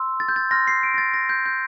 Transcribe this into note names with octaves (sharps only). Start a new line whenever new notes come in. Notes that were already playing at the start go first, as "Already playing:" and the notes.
Already playing: C6 E6
A6
G6
A6
C6 F6 A#6
C7
D7
A#6
A6
A#6
G6
G6